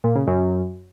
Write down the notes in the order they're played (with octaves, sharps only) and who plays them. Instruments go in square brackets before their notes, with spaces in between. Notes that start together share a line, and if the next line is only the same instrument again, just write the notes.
[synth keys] A#2
C#3
F#2